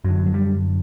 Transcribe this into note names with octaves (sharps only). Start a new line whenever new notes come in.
F#2 D3 F#3
F#3
G3